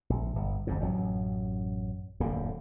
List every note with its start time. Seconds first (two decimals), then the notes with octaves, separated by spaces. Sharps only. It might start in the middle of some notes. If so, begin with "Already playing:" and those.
0.10 A#1
0.36 G1
0.67 G1 F2 G#2
0.81 A1 F#2 F#3
2.20 D1 F2 D3 A#3